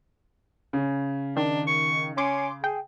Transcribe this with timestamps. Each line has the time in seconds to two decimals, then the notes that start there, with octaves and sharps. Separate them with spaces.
0.73 C#3
1.37 D#3 D4
1.67 C#6
2.17 C#4 G#5 C6 D6
2.64 G#4 G5